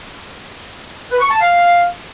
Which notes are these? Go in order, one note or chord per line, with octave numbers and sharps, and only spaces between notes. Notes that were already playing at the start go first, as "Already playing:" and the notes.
B4
C#6
A5
F5